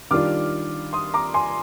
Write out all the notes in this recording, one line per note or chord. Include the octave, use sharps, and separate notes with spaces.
D#3 G3 D4 F4 D6 F6
C6 D#6
A#5 D6
G#5 C6